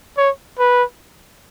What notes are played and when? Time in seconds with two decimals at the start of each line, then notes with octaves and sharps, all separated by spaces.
0.17 C#5
0.59 B4